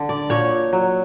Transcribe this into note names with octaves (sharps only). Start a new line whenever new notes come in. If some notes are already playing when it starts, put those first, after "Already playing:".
Already playing: D3
D5
A#2 C#5
F#3